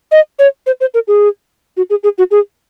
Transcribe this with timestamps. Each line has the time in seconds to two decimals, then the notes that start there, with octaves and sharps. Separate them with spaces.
0.11 D#5
0.39 C#5
0.66 C5
0.80 C5
0.94 A#4
1.08 G#4
1.77 F#4
1.90 G#4
2.03 G#4
2.18 F#4
2.31 G#4